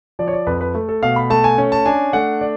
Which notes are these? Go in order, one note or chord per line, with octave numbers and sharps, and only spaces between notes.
F3 D5
C#5
D5
F2 B4
B4
A3
A4
B2 F5
B5
A3 A5
G#5
C#4
A5
D4 G#5
A3 F#5
D5